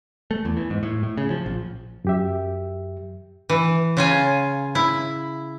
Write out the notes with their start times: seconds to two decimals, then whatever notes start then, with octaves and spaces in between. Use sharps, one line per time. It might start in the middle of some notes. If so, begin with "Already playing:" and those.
0.31 A3
0.45 E2
0.57 E3
0.70 G#2
0.83 A2
1.03 A2
1.18 C#3
1.30 F3
1.46 A#1
2.05 F#2 G4 E5
3.49 E3
3.97 C#3 F4 G#5
4.75 E4